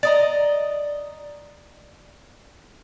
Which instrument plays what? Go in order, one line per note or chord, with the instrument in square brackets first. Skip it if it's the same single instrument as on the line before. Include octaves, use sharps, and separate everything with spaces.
[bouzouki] D5 D#5 A#5